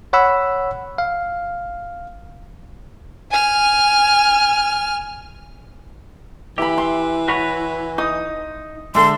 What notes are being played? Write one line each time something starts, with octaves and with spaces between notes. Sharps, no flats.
C#5 F#5 B5 E6
F5
G#5 F6
E3 G4 E5 B5
C6
F#4 B4 C#5
D#4 D#6
D3 G#3 A4 E5 C6